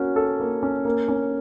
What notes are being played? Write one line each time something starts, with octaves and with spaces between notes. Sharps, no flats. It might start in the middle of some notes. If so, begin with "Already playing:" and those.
Already playing: A#3 C#4 F#4
A4
A#3
C#4
A#3
C#4